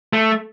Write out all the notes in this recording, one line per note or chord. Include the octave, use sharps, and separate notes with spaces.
A3